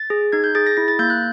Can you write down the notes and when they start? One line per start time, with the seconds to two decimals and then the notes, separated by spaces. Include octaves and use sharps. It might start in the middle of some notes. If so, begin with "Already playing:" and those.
Already playing: A6
0.10 G#4
0.32 D#4 G#6
0.44 G6
0.55 G#4 A6
0.66 A#6
0.77 E4 A#6
0.88 A6
0.99 A#3 G6
1.10 F#6